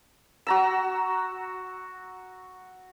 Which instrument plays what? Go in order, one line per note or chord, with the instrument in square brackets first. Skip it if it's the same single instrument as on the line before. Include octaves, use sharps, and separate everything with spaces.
[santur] F#4 A#5 E6